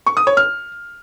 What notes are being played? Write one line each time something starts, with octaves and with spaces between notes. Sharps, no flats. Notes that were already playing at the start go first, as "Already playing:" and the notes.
C#6
D#6
C#5
F6